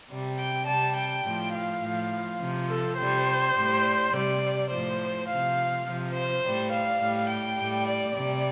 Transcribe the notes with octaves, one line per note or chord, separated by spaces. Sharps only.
C3 G3
G5
C3 G3 A5
G5
A2 F3
F5
A2 F3
C3 F3
A4
C3 G3 C5
A2 G3
C3 G3 D5
A2 F3 C5
C3 F3 F5
C3 F3
C5
A2 G3
F5
A2 G3
G5
A2 G3
D5
C3 G3 D5